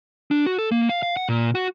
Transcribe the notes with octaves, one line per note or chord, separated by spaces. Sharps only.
D4
F#4
A4
A#3
F5
F5
F#5
A#2
F#4